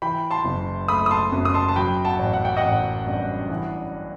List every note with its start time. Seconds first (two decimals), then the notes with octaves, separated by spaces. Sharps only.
0.02 E3 G5 B5
0.31 A5 C6
0.45 F#1
0.88 A3 B5 D#6
1.06 D#6
1.11 A5 C6
1.32 F#2
1.45 D#6
1.54 A5 C6
1.68 A5
1.76 F#3 G5 B5
2.05 F#5 A5
2.19 A1
2.33 F#5
2.45 G5
2.57 D#5 F#5
2.63 A1
3.07 G2
3.50 E3